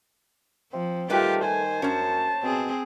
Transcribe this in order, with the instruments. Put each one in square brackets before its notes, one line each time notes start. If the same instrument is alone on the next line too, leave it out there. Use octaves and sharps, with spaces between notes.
[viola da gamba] F3 [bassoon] C4
[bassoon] D#3 [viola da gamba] G3 G4 [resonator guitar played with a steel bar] A3 B4 G5 [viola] F4
[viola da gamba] C5 [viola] G#5
[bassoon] F#2 [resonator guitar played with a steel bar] C#4 C#5 [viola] A5
[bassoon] B2 [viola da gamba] C4 G#4